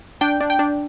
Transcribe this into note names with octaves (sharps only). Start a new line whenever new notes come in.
D4 G5
D4
G5
D4